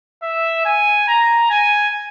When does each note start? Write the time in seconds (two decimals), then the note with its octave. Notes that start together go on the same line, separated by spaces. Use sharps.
0.23 E5
0.66 G#5
1.08 A#5
1.50 G#5